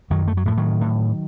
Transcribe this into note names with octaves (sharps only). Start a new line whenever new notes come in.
F#2 D#3 F#3
A3
F#3
A2 F3
D#3 F#3
A2